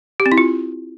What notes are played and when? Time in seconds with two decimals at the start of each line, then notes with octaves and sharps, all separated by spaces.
0.20 G4
0.26 C4
0.32 E4
0.38 F4